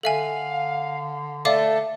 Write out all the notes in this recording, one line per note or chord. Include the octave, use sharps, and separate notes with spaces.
D3 A4 E5 F5 G#5
A3 A4 D5 F5 D6